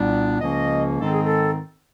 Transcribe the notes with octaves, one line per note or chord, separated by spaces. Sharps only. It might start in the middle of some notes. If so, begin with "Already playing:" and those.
Already playing: C2 A#2 G3 B3 D4
C#2 C#3 F3 A#3 C#4 D#5
G#2 D#3 G#3 C4 A4
G#4
A4